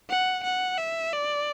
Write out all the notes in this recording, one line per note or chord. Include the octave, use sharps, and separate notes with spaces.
F#5
F#5
E5
D5